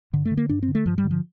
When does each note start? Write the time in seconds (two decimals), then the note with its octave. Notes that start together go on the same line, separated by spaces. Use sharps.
0.13 G2 D3
0.25 A3
0.31 D3
0.37 A#3
0.49 G2 D4
0.63 C4
0.68 D3
0.75 A3
0.86 G2 F3
0.98 G3
1.04 D3
1.11 F3